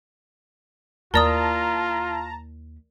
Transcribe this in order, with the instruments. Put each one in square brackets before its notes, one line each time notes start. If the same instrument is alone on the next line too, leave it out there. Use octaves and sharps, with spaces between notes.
[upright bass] D#2 E4 [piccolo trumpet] F4 [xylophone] A#4 D5 D#6 [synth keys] A5 A#5